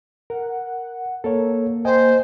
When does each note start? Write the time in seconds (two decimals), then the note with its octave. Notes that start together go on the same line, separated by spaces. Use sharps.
0.30 A#4 F#5
1.24 A#3 A4 A#4 C#5
1.85 C5 D#5 G5 G#5